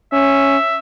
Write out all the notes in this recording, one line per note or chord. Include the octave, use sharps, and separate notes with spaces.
C#4 E5